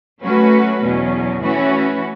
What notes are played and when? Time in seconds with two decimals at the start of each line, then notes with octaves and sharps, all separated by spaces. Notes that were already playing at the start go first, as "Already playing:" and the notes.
0.23 F#3 A3 C#4 F#4 B4
0.82 E2 B2 F#3 C#4
1.42 E3 A3 C#4 F#4 B4